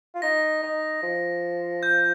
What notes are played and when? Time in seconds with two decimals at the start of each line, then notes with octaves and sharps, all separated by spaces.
0.15 F4
0.22 D#4 A#6
0.62 D#4
1.03 F3
1.83 G6